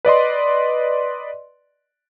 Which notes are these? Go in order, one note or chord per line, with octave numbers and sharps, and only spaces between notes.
B4 D5 D#5 C6